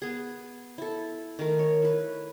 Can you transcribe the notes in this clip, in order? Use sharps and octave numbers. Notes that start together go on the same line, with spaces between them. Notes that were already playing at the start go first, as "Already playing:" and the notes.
B3 G#4
E4 A4
D#3 A3 A#4
C#5
E4 B4